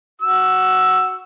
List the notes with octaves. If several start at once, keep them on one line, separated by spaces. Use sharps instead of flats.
F#4 E6